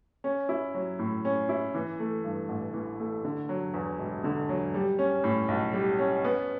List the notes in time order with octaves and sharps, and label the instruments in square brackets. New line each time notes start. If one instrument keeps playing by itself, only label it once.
[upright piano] C#4
E4
F#3
A2
C#4
E4
E3
A3
G2
A1
E3
A3
D3
F#3
E2
E1
D3
F#3
G3
C#4
A2
B1
G3
C#4
B3